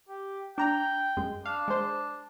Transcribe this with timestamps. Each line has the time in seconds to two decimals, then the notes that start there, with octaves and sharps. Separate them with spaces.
0.09 G4
0.58 D4 G5 A#5
1.17 F#2 G#3
1.45 D4 F5
1.68 G#3 C5